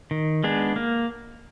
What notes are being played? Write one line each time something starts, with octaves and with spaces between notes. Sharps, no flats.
D#3
G#3 B3 D4 G#4
A#3